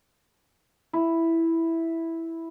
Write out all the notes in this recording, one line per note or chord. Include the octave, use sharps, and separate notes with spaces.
E4